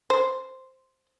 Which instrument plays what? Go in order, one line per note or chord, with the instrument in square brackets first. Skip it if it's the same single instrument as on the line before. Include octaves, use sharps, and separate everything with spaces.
[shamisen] C5